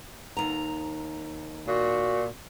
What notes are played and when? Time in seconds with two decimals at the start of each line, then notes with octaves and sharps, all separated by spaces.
0.37 D#2 A#5
1.67 A#2 F#4